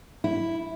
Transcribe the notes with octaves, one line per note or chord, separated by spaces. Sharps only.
E4